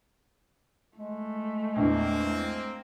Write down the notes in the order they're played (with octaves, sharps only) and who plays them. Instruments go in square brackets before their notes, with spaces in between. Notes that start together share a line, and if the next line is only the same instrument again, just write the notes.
[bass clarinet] G#3 [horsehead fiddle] A3
[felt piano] A#1 E2 [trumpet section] A#3 C4